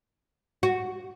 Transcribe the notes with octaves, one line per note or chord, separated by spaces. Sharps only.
F#4